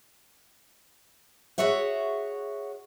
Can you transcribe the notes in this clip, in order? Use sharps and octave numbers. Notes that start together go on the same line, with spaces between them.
F#4 G#4 C#5 E5 F#5